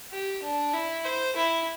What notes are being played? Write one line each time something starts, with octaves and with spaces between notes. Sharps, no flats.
G4
D4
E4
C5
E4